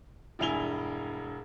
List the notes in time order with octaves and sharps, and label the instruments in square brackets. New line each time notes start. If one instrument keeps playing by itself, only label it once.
[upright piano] E1 G2 E4 G#5 F7 G7